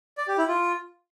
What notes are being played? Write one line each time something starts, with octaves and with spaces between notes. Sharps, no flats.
D5
G4
E4
F4